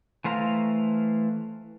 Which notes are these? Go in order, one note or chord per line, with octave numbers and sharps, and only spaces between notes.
E3 A3 C5 F5 A#5